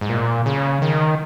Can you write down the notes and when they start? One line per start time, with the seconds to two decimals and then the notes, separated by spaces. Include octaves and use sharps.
0.01 G#2
0.09 A#2
0.46 C#3
0.82 D#3